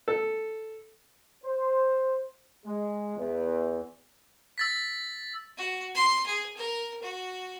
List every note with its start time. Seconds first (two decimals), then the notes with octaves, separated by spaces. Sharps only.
0.08 A4
1.43 C5
2.65 G#3
3.16 E2
4.58 E6 A6 B6
5.57 F#4
5.95 C6
6.26 G#4
6.56 A#4
7.02 F#4